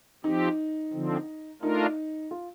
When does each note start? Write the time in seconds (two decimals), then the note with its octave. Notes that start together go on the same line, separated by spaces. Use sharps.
0.24 F3 C4 D#4 G4
0.93 D3 F3 C4
1.62 A3 D4 D#4 F4 A#4
2.31 F4